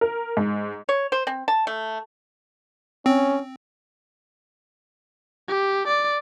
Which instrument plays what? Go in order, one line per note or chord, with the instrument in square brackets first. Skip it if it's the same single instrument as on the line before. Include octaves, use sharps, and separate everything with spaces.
[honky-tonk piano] A#4
G#2
[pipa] C#5
C5
C4
A5
A3
[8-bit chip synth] C4 [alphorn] C#4
[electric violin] G4
D5